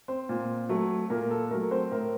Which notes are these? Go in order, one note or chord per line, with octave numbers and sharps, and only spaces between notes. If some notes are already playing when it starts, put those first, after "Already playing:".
C4 C5
A#2
F#3 A3
A#2 A#4
A4
F#3 A3 A#4
C4 C5
A2 A#4